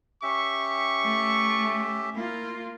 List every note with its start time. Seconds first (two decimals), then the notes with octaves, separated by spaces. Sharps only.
0.23 C#4 G4 E5 C#6
1.03 A3
2.16 A#3 E4 F4